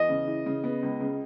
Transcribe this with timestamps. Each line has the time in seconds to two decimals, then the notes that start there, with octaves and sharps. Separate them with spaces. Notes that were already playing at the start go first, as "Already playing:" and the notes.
Already playing: E2 D#5
0.09 C#3
0.28 E3
0.46 C#3
0.64 B3
0.83 C#2
1.00 C#3